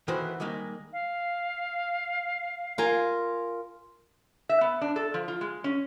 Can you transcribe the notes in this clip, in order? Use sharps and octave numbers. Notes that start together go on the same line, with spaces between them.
D#3 E3 A3 B3 F#4 C5
D#3 G3 G#3 A#3 D#4
F5
F4 A#4 G#5
E5
B3
D4
A4
F3
F4
G#3
C#4